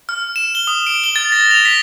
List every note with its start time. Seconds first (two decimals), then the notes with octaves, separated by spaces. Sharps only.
0.09 F6
0.36 E7
0.55 G7
0.67 D#6
0.87 D7
1.04 G7
1.16 A6
1.32 A#6
1.51 F7
1.65 B6